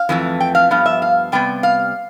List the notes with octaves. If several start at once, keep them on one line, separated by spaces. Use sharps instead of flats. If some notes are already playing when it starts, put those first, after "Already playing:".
Already playing: F5
F2 E3 A3
G5
F5
G2 F3 B3 F5
E5
F5
C3 G3 B3 G5
F5